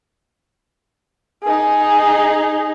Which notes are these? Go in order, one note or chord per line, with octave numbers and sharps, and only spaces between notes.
D#4 G#4